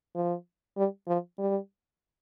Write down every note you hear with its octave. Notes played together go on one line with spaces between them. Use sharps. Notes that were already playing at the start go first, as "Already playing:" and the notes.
F3
G3
F3
G3